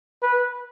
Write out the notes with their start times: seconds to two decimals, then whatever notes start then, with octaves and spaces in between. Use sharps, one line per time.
0.22 B4